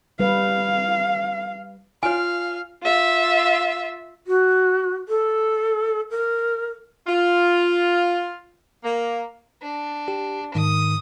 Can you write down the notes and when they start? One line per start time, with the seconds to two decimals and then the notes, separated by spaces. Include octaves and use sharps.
0.20 G3 B4 F5
2.03 F4 C#5 F5 G#5
2.82 F4 E5
4.27 F#4
5.08 A4
6.11 A#4
7.07 F4
8.84 A#3
9.62 D4
10.08 G4
10.55 G#2 D#3 D#6